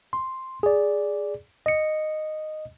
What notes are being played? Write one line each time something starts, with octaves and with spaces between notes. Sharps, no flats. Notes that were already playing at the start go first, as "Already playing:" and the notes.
C6
G#4 D5
D#5 C#7